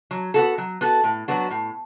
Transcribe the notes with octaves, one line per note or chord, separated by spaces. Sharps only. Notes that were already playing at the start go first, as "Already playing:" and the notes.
F#3
B3 F#4 A4
F#3
B3 F#4 A4
A2
F#3 B3 D4 F#4
A2